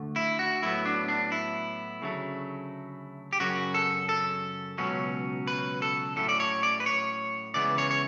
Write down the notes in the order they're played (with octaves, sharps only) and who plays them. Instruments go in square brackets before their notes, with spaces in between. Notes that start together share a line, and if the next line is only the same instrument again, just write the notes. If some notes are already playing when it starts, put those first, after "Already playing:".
Already playing: [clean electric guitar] D2 D3 A3
E4
F#4
A2 F#3 B3 E4
D4
D4
E4
D2 C#3 F#3 A3
G4
F#2 C#3 F#3 C#4 F#4
A4
A4
C#2 B2 F#3 C#4
B4
A4
A2 F#3 A3 C#4 A4
D5
C#5
D5
B4
C#5
C#2 C#3 E3 B3 D5
C#5
C#5